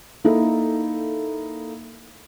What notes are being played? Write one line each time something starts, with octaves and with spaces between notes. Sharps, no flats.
A#3 D#4 E4 A4